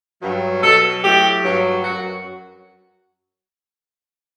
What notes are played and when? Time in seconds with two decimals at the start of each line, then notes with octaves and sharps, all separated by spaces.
0.21 G2 F#3
0.62 B2 F#3 A4
1.03 A2 F#3 G4
1.44 G2 F#3
1.84 F#2 F#3 F#4